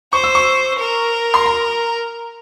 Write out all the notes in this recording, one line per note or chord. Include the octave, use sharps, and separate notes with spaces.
C5 C#6
E6
C#6
A#4
C6
A#5